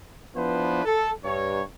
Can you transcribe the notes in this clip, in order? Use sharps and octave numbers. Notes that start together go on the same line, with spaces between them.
F3 B3 D4 E4 B4 C5
A4
G2 C#5